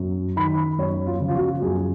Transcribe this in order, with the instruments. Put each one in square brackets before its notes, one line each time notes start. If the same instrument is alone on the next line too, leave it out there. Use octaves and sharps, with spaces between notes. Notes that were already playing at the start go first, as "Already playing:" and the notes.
Already playing: [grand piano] F#2
D#3 B5
F#2 C#5
F4
C#3 F3
F4
F#4
F#2 G#4